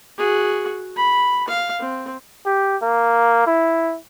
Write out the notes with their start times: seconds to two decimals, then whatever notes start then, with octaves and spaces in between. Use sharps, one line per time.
0.18 F#4 G#4
0.96 B5
1.48 F5
1.80 C4
2.45 G4
2.82 A#3
3.46 E4